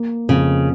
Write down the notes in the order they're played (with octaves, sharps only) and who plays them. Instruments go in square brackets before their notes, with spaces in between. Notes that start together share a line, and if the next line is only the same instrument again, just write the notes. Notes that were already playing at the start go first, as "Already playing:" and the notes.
Already playing: [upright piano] A#3
[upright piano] F2 [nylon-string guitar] C#3